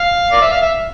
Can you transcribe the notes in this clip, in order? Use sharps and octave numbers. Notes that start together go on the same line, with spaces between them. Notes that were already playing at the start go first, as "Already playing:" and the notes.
Already playing: F5
D5
E5
F5
E5